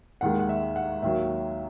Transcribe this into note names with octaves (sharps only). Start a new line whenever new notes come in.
D#2 D#3 G#3 F#5
F#5
E5
F#5
D#2 D#3 F#3 E5